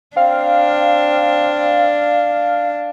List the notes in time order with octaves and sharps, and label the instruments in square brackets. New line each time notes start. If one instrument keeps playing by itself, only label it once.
[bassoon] C4 [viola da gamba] D4 [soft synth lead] F5